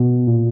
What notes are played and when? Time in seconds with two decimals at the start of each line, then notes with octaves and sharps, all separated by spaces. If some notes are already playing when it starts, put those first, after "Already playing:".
Already playing: B2
0.27 A#2